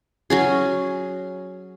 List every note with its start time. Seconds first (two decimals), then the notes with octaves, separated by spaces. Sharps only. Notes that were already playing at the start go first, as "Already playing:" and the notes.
0.30 F#3 C#4 G#4